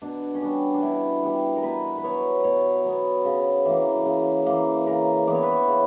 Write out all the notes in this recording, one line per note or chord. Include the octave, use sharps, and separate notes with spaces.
B2 D4
C#4
G3 B3 D4
D4
B2 E4
G3 B3
A#4
B2 B4
B4
F#3 B3 C#5
B2 C#5
F#3 B3
C#3
E3 A#3
C#3
E3 A#3
C#3 A#4
E3 B3 D5
C#5
B4
C#5
C#3